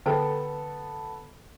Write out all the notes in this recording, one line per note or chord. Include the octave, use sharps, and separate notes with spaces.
D3 B3 A4 G5